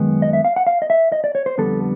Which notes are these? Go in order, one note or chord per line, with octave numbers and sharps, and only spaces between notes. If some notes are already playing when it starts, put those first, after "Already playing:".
Already playing: F#2 D#3 G#3 B3
D#5
E5
F5
F#5
F5
D#5
E5
D#5
D5
C#5
C5
F2 D3 G3 B3 A4